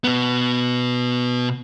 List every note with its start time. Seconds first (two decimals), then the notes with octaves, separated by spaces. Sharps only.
0.04 B2 B3